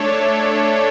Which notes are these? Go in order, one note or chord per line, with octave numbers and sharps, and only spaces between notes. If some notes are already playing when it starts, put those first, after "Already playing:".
Already playing: A3 D4 A4 C#5